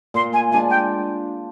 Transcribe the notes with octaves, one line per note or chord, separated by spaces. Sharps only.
A#2 C6
G#5
G#3 D4 F4 G#5
G5